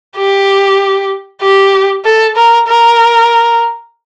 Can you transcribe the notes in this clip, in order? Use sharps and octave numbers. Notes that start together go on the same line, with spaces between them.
G4
G4
A4
A#4
A#4